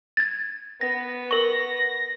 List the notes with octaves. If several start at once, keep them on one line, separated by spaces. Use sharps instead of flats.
G#6 A6
B3 A#6
A#4 C#6 A#6